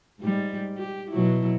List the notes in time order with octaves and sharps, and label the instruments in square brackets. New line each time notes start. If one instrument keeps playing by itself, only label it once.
[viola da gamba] G#2 G3
G4
B2 F#3 E4